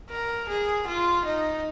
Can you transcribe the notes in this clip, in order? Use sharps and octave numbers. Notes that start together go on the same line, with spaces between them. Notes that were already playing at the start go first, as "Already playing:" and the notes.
A#4
G#4
F4
D#4